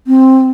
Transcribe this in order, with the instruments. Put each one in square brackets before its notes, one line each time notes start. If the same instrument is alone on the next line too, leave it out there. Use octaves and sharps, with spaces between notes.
[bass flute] C4